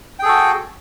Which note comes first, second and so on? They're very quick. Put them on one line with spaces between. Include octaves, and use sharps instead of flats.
G5 G#4 A4 F#4